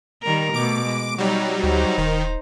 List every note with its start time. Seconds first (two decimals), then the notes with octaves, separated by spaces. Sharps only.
0.23 D#3 G3 A#4
0.54 B2 A3 D6 D7
0.86 G#3
1.18 F#3 G3 D#4
1.63 D2 D#4 C5
1.98 D#1 D#3